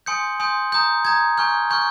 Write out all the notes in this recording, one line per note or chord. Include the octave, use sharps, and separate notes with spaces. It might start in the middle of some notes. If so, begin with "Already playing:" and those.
G#5 C6 D#6 G6 C#7
G#5 C6 D#6 G6
A#5 D#6 G6
A#5 D#6 G6 G#6
G#5 C#6 F6 G6
G#5 C#6 F6 G6